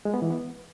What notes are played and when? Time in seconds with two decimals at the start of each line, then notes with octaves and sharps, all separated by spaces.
0.05 G#3
0.14 B3
0.22 E3
0.30 B3